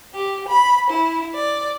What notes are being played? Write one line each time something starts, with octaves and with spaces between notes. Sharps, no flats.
G4
B5
E4
D5